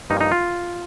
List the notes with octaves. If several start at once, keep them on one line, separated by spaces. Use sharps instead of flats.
G2 F3 A#3 D#4
D#4
F4